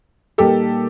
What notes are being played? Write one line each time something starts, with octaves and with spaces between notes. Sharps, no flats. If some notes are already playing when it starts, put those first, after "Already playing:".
A#2 G3 A#3 D#4 G4 A4